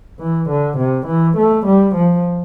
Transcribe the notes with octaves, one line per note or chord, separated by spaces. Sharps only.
E3
D3
C3
E3
A3
G3
F3